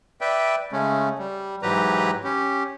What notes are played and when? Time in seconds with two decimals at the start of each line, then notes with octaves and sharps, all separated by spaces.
0.21 B4 D5 E5 G5
0.72 C#3 G#3 A3 C#4
1.19 G3
1.63 G#2 E3 F#3 G4 B4 A#5
2.24 C#4 G4